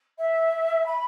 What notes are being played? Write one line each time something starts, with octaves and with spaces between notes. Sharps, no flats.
E5
B5